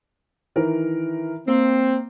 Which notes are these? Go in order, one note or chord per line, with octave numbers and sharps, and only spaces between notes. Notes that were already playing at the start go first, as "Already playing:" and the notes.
D#3 E3 A#4
A#3 C4